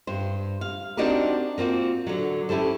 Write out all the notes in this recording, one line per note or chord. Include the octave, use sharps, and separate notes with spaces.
G2 C5
F5
C4 D4 D#4 F#4 G4 A#4
A#3 C4 F4 F#4
D3 F#3
C#4 E4 G4 A4 C5